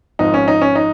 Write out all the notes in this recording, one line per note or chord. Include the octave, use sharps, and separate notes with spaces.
G#1 G#2 F3 D#4
C#4
D#4
C#4
D#4